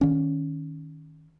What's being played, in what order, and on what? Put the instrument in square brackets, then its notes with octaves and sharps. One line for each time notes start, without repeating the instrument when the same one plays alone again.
[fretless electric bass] D#3 C#4